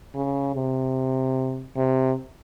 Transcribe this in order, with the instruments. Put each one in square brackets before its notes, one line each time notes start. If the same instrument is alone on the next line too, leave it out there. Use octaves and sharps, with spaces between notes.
[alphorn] C#3
C3
C3